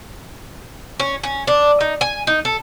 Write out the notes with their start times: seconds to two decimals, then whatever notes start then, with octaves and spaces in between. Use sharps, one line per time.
1.00 C#4
1.24 C#4
1.47 D4
1.81 D#4
2.01 G#5
2.27 D#4
2.45 A4